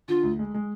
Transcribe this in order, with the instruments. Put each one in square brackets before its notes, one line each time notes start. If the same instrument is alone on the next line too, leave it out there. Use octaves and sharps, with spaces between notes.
[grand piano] D3 [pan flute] F4
[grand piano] D2
G#3
G#3